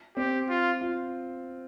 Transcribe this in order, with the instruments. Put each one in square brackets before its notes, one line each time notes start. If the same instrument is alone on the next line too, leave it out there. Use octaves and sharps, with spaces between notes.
[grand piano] C4 [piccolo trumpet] G4
[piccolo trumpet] F4
[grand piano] F4